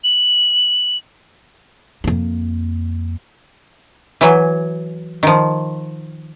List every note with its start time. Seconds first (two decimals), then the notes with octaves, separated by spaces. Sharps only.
0.04 F#7
2.04 F2 A#3
4.21 E3 F#3 G#5
5.23 D#3 F3